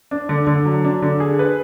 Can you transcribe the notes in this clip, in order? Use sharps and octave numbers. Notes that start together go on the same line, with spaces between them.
D4
D3
D3
F#3
D4
D3
G#4
B4